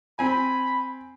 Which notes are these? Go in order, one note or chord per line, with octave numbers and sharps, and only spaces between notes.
C4 G#5 B5